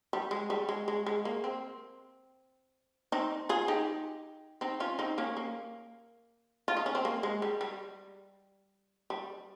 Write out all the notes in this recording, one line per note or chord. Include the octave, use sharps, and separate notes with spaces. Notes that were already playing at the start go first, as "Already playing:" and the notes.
G3
G#3
G3
G#3
G#3
G#3
A#3
C4
C4 D#4
F4 G#4
D#4 G4
C4 D#4
C#4 F4
C4 D#4
A#3 C#4
A#3
F4
D#4
C#4
C4
A#3
G#3
G3
G3
G3